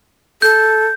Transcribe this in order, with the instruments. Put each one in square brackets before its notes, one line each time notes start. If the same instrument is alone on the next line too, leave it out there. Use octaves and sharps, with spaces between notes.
[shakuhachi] A4 [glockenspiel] G6